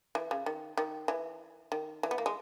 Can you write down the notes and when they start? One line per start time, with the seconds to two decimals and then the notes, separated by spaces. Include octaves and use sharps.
0.15 E3
0.31 C#3
0.46 D#3
0.77 D#3
1.08 E3
1.72 D#3
2.03 E3
2.11 B3
2.18 A#3
2.26 G#3